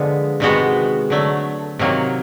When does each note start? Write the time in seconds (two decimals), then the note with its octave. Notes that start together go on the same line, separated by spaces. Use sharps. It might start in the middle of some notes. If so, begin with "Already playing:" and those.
Already playing: D3 F3 G#3 B3
0.40 C3 D#3 G#3 B3 F#4
1.10 D3 F#3 A3
1.79 C3 D#3 F#3 A#3